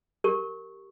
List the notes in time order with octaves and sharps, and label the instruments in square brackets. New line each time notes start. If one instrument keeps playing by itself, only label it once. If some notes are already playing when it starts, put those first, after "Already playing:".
[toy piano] G4 A#4 C#6